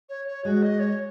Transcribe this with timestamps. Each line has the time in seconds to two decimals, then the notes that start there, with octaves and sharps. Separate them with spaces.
0.09 C#5
0.28 C#5
0.45 G#3 F#4
0.63 D#5
0.80 C#5